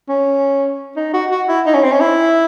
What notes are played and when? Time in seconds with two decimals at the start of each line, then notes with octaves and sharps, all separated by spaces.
0.09 C#4
0.96 D#4
1.13 F#4
1.31 F#4
1.48 E4
1.66 D#4
1.74 C#4
1.83 C4
1.91 C#4
2.00 E4